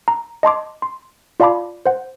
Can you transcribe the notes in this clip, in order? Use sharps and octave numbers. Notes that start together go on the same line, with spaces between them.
A#5
D#5 A5 C6 D6
C6
F4 D5 F5 A5 B5 D6
C5 F#5